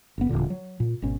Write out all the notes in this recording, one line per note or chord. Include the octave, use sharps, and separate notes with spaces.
F#1 B3
E1 C#2 A#2 D3
F#3
A#2
G#1 B2 C#4